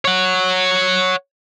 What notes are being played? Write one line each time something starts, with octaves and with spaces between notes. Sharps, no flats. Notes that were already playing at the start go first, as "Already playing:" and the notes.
C#5 F#5